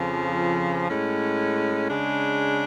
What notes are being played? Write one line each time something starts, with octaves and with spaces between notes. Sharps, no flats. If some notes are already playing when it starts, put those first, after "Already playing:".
Already playing: F2 C#3 F3
A2 G#3 C#4
C#3 G#3 D4